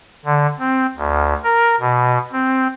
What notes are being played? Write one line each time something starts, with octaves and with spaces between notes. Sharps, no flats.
D3
C4
D2
A#4
B2
C4